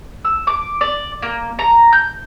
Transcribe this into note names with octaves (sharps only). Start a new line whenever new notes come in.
E6
D6
D5
A#3
A#5
G6